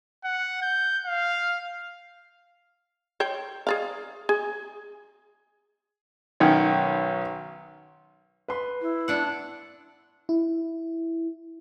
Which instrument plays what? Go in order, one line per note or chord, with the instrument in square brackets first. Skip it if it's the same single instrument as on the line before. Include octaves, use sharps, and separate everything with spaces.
[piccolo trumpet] F#5
G6
F5
[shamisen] C5 C#5 G5
G#4 D5 F5
G#4
[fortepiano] B1 D#3 C#4 C#5 G5
[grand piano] B4 C6
[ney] E4
[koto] B3 D4 F#5
[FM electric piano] E4